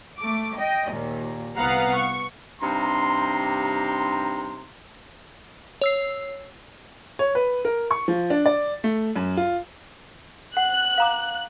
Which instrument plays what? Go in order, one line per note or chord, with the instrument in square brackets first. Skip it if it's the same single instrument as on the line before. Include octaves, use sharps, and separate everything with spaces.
[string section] A3 D6
D#5 G5
D#2 A#2
C2 B3 F5 F#5 A#5
C#6
[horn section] G2 C3 D#4 A#5 C6
[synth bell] C#5 E6 C7
[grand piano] C#5
B4
A#4
C#6
F3
D4
D5
A3
F#2
F4
[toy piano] F#5 [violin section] F#6
[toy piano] F5 A#5 D6